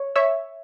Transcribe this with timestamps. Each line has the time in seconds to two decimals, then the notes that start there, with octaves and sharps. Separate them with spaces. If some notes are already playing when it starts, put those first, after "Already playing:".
Already playing: C#5
0.16 C#5 E5